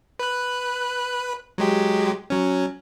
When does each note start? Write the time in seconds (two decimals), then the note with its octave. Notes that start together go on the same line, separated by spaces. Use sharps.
0.19 B4 F#6
1.58 F#3 G#3 G4
2.30 F#3 C#4